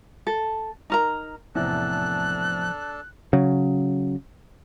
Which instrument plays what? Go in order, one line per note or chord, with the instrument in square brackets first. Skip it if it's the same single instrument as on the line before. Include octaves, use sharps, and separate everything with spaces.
[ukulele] A4
D#4 A#4 A#5
[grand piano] E2 A2 C3 [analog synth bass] F3 [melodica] D4 A4 A5 [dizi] F#6
[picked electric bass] C#3 F#3